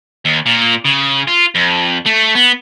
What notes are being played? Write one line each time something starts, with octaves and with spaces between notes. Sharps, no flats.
D#2
A#2
C#3
F4
F2
A3
B3